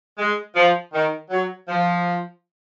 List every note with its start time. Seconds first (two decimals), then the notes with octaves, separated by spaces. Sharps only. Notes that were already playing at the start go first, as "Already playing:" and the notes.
0.19 G#3
0.55 F3
0.94 D#3
1.30 F#3
1.68 F3